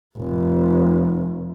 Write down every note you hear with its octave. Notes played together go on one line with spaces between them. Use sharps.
F1